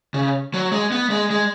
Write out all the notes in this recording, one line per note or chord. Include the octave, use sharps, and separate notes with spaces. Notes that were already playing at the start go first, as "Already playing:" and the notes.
C#3
F#3
G#3
B3
G#3
G#3